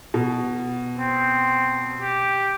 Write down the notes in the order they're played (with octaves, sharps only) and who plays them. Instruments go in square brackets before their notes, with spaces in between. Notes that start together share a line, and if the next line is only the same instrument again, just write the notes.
[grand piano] B2
[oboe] C4
G4